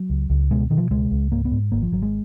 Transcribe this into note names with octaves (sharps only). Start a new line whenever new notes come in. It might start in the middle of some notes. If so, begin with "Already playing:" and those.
Already playing: F#3
C#2
C#2
B2 G#3
B2 D#3
F3
C#2 G#3
C#2
G#2 A#3
B3
G#2
G#1 A#3
F3
G#1 F#3
G#3